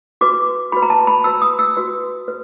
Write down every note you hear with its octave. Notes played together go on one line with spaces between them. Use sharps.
F#4 B4 D6
F#4 B4 B5
A#5
A5
B5
F#4 B4 E6
D#6
E6
F#4 B4
B4